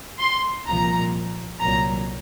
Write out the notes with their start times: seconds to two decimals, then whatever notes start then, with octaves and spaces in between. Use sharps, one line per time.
0.19 C6
0.67 C2 A#2 F3 A#5
1.60 C2 A#2 F#3 A#5